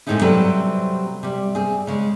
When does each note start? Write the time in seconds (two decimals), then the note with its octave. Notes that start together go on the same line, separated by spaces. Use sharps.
0.07 A2 G#3 C4 C#4 D#4 E4
0.22 C3 F#3 G3 C4 A4 B4
1.23 C3 G3
1.55 C4 G#4
1.87 C#3 G#3